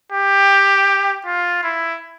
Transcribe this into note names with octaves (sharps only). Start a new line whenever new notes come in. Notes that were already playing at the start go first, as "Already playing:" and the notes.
G4
F4
E4